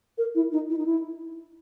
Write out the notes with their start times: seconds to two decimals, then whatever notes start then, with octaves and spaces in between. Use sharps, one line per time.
0.18 A#4
0.35 E4
0.52 D#4
0.70 E4
0.79 D#4
0.86 E4